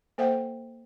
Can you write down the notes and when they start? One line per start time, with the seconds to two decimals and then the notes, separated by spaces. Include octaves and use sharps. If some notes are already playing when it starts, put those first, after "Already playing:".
0.18 A#3 A4 C5 E5 F#5 G5